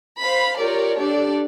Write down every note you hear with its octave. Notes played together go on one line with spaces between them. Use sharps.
C5 F5 B5
F4 G4 A#4 C#5 D5
D4 G4 A4 D5